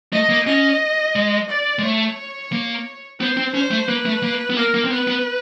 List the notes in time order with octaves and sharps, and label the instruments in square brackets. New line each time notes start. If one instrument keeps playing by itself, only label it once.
[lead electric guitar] A3 [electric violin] D#5
[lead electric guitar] A#3
[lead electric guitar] C#4 [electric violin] D#5
[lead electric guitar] G#3
[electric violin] D5
[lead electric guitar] G#3
[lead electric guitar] A3 [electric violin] C#5
[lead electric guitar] A#3
[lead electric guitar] B3 [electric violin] C5
[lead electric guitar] C4
[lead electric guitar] C#4 [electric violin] C5
[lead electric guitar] A3
[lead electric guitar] A#3 [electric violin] B4
[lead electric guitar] A3
A#3
B3
[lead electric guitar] A#3 [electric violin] A#4
[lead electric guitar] A#3
C4
[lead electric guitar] B3 [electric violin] B4
[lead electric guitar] B3